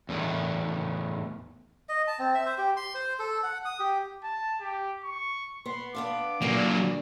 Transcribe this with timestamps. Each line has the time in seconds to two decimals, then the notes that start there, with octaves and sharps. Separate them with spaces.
0.09 E2 A2 D#3
1.89 D#5
2.07 A5
2.19 C4
2.35 E5
2.46 C5
2.58 G4
2.77 C6
2.95 C5
3.19 A4
3.43 F#5
3.65 D#6
3.80 G4
4.23 A5
4.61 G4
5.04 C#6
5.66 B3 C6
5.95 B3 D4 F5 D6
6.42 A#2 D3 F#3 A#3 D4